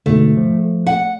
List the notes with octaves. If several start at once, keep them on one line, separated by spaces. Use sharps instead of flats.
G#2 B2 D3 A3
F3
F#5